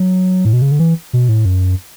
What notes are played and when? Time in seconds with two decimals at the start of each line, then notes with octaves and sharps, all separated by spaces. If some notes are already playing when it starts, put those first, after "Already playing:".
Already playing: F#3
0.45 A2
0.53 B2
0.62 C#3
0.72 D3
0.79 E3
1.13 B2
1.29 A2
1.45 F#2